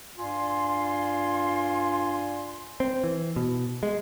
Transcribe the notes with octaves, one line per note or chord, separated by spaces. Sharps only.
G2 F4 D5 G#5 C6
C4
E3
B2
G#3